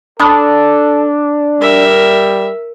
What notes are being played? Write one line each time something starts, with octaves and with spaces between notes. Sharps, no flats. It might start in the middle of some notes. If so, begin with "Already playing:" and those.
D4 A4 A5 B5 D#6
G3 A#4 E5